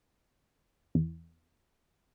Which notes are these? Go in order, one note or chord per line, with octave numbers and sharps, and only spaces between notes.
E2